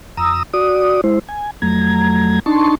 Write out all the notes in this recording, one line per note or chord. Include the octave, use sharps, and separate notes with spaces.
F2 A#5 D#6 E6
F#4 D5 D#6
G#3 E4 C5
G#5
F2 F#3 A3 A#5 G#6
D4 D#4 A5 C6 C#6